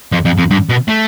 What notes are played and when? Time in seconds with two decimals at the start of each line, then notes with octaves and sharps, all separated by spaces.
0.12 F2
0.25 F2
0.38 F2
0.51 G2
0.69 B2
0.88 A3